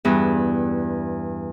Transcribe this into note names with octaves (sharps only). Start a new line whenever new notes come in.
E2 G2